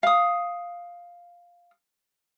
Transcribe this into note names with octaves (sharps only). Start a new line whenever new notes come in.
F5 D#6